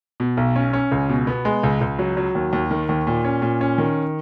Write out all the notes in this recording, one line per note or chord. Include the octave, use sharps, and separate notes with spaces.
B2
B1
C#4
C#4
C#2
B2
B3
G#3
C#2
C#2
F#3
F#3
D#2
D#2
D#3
D#2
A#2
C#4
A#2
C#4
D#3